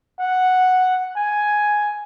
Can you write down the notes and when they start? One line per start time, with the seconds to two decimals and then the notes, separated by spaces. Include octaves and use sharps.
0.19 F#5
1.16 G#5